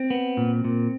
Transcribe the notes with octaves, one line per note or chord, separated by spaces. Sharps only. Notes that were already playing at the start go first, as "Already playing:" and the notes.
Already playing: C4
B3
A#2
A#2